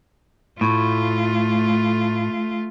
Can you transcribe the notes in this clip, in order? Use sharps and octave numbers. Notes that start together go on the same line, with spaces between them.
A2 A3 F4